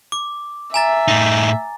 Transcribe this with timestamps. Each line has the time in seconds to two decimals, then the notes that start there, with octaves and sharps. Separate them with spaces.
0.12 D6
0.74 E5 G#5 A#5 A6
1.08 A2 D#4